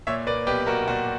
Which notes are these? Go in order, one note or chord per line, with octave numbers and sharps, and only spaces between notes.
A#2 C#5 E5
A#3 B4 D5
B1 G4 B4
B1 F#4 A#4
A#2 F#4